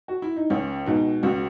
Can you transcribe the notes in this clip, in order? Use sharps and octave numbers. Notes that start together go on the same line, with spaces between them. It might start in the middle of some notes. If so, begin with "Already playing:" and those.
F#4
E4
D#4
C#2 C#4
B2 G#3 D#4
C#2 F#4